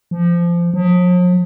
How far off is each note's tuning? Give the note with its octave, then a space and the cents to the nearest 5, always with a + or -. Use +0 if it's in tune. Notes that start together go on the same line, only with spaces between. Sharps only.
F3 -20
F3 +45